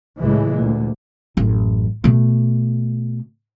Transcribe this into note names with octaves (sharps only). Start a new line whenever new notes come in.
C#2 A2 E3 G#3
D2 A#2
A1 F#2
B2 A3